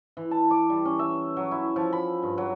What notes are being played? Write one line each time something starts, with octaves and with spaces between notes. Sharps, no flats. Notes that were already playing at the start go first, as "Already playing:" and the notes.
E3
A5
D6
G3
C#4
E5
F#3
E4
F3
B5
G2
F#3